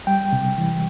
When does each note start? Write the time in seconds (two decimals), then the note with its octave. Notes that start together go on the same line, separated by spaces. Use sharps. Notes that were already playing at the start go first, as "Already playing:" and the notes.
0.07 G3 G5
0.33 C3
0.58 E3